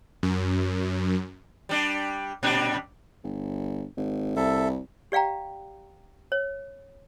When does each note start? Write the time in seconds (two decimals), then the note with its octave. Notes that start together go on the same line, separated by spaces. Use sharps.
0.23 F#2
1.69 G3 D4
2.43 A#2 G3 D4
3.24 G1
3.97 G#1
4.36 C2 A4 E5
5.12 G4 D5 F5 G5 A#5
6.32 C#5